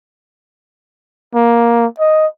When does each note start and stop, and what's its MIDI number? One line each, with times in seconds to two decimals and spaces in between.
1.35 1.86 58
2.00 2.27 75